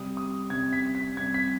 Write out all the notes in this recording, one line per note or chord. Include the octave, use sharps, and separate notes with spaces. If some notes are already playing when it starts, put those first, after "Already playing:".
Already playing: C3 G3 D#6
D#6
C3 G3 G#6
B6
B6
C3 G3 G#6
B6